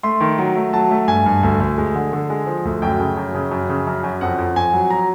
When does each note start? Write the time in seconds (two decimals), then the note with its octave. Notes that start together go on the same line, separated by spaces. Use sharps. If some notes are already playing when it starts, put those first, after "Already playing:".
0.03 A3 C6
0.20 D#3
0.38 F#3
0.56 A3
0.73 F#3 A5
0.91 A3
1.08 G2 G#5
1.26 G2
1.43 D2
1.60 D2
1.78 G#3
1.95 D3
2.13 D3
2.30 G#3
2.47 F3
2.65 D2
2.82 F#2 G5
3.00 C#3
3.17 F#2
3.35 C#3
3.51 F#2
3.69 C#3
3.87 F#2
4.04 F#2
4.21 F2 F#5
4.38 F2
4.56 F2 G#5
4.73 F#3
4.91 F#3 A#5